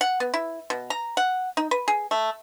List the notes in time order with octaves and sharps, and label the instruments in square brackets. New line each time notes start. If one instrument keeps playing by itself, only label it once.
[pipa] F#5
B3
E4
B2
A#5
F#5
D#4
B4
G#4
A3